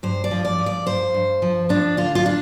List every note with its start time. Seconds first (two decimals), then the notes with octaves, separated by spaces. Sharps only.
0.03 G2 C5
0.24 D5
0.31 F3
0.45 D5
0.59 F3
0.66 D5
0.86 G2 C5
1.14 G2
1.42 F3
1.69 F3 D4
1.97 D3 F4
2.15 F4
2.26 D4